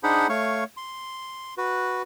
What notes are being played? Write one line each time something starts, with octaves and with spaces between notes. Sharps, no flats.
D4 D#4 G#4 C5 F#5 B5
A3 C#5 F5 C#6
C6
F#4 B4